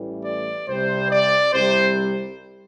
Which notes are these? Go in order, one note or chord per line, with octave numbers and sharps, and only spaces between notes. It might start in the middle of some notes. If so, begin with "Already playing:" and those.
Already playing: A1 A2 E3 G3
D5
C2 C3 G3 C5
D5
C2 C3 G3 C5